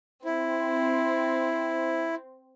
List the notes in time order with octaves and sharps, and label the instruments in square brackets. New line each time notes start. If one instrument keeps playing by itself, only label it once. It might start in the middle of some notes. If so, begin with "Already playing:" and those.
[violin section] C4 [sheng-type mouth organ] E4